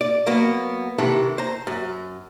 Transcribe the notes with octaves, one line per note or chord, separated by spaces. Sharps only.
D5
F#3 A#3 B3
C3 D#3 E3 A4
C5 A#5
F#2